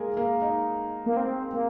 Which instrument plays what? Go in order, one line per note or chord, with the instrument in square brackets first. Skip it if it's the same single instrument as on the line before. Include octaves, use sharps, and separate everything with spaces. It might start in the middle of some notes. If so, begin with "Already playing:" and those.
Already playing: [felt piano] G#3 A#3 G#4 A#4
A#3 A#4
D#4 D#5
[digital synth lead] A#3
C4
A#3